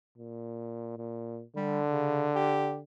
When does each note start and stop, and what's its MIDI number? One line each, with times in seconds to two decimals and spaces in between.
0.18 0.95 46
0.98 1.43 46
1.57 2.83 50
1.57 1.80 55
1.90 2.29 49
2.35 2.77 67